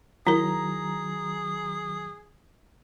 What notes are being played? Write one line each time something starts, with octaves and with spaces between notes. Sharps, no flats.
D#3 F#3 E4 G#4 A#4 A#5